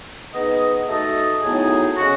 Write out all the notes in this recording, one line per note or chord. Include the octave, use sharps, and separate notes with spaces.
B3 D#4 G#4 D#5
A3 D#4 F#4 A4 D#5
A2 F#3 B3 D#4 G#4
C#3 G#3 C#4 F#4